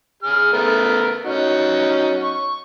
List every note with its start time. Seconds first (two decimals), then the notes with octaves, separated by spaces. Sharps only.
0.23 G#4 F6
0.53 A3 B3 A#4
1.25 C#4 D#4 F#4
2.23 C#6